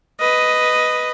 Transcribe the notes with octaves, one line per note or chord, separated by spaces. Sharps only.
B4 D#5